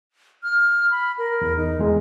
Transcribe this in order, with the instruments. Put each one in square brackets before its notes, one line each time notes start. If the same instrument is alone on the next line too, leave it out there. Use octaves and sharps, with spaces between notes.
[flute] F6
B5
A#4
[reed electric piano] E2
[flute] D#4
[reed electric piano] E2 G#3